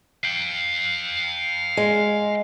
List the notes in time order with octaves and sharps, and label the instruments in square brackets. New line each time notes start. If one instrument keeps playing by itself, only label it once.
[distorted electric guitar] F5 G5
[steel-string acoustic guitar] G#3